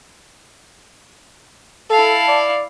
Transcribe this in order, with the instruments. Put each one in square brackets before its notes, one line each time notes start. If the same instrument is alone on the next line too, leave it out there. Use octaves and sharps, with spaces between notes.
[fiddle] E4 F5 [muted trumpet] A4 [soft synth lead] A5
[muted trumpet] D5